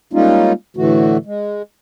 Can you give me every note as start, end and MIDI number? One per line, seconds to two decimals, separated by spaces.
0.13 0.52 55
0.13 0.52 56
0.13 0.52 58
0.13 0.52 61
0.13 0.52 63
0.13 0.52 65
0.77 1.17 45
0.77 1.17 50
0.77 1.17 52
0.77 1.17 57
0.77 1.17 66
1.25 1.62 56